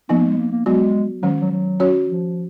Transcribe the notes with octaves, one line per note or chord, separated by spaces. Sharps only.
F3 A#3 B3 D#4
A#3
G#3
A#3
A#3
F#3 G#3 B3 F#4
D#3 F#3 G#3 C#4
F#3
F#3
C#4 F#4 C#5
F3